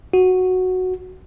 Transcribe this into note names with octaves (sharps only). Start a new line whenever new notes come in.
F#4